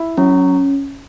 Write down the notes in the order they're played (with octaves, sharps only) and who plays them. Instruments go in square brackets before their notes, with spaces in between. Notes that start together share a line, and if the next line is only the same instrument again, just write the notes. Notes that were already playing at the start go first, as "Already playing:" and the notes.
Already playing: [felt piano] E4
[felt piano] F#3 [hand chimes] C#4